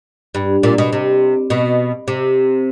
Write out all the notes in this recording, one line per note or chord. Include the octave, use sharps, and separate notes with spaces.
G2
A#2
B2
C3
B2
C3